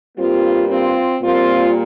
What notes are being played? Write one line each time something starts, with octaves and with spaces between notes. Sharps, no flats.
G2 G3 A#3 C4 F4
C4 F4
A#2 G3 A#3 C4 F4